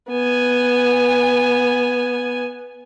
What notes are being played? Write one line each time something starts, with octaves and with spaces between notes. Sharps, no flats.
B3 G#5